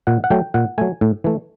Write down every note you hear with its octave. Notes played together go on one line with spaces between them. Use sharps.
A#2 F#5
F#5
F#3 A3 G5
A#2 F#5
F#3 A3 G#5
A2
E3 A3